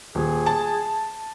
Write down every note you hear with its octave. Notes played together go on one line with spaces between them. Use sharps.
D#1 G#4
A5